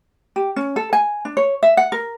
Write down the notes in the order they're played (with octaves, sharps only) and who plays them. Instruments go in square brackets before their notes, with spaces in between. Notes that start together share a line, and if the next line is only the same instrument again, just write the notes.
[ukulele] G4
C#4
A4
G#5
D4
C#5
E5
F#5
A#4